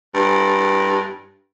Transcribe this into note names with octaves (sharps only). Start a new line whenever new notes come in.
G2